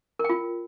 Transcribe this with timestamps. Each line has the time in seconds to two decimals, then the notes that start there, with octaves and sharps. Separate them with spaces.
0.19 A#4
0.24 G5
0.29 F4